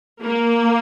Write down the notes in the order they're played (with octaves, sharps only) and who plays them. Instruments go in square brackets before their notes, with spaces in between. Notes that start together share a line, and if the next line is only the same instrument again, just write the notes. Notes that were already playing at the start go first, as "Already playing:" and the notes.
[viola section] A#3